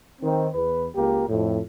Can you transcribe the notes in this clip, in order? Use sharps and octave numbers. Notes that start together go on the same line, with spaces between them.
D#3 C4
E2 B4
C#2 A#3 G4 A#4
F2 A2